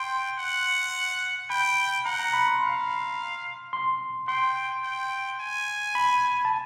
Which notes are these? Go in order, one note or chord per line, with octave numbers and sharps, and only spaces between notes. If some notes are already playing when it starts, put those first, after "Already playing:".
Already playing: G5 C6
F#5
G5 B5
F#5 A#5
A#5
B5
C6
F5
C6
G5 C6
G5
G#5
B5
A5